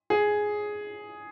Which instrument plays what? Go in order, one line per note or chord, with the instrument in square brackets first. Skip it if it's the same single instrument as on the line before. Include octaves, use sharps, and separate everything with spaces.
[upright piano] G#4